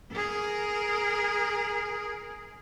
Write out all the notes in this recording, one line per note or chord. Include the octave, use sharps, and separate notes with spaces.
G#4 A#4